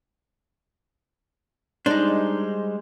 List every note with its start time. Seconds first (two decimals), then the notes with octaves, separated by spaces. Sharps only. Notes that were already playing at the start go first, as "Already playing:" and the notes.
1.86 G3 G#3 D4 D#4 C5